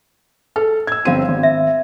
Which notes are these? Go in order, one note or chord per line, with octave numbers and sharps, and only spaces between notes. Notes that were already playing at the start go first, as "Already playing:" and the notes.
A4 B4
E6 G#6
G1 C4 F#4 F5 D#7
G#1
E5